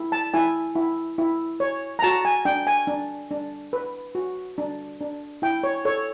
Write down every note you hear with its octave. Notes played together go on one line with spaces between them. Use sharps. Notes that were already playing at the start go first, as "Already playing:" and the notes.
Already playing: E4
A5
E4 G#5
E4
E4
C#5
A#5
F#4 A5
G#5
D4 G5
G#5
D4
D4
B4
F#4
D4
D4
E4 G5
C#5
A4 C#5